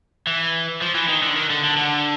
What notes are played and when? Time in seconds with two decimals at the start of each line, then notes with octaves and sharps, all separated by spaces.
0.27 E3
0.82 F3
0.95 E3
1.09 D#3
1.23 D3
1.36 D#3
1.50 D3
1.64 D3
1.77 D3